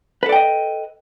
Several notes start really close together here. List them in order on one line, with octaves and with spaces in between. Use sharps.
B4 A4 D5 G5 D#5